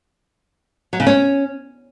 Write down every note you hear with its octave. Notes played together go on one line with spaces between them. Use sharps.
F#3
C#3
C#4